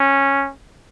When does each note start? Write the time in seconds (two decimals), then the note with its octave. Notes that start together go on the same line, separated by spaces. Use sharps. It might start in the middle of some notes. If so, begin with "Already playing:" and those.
Already playing: C#4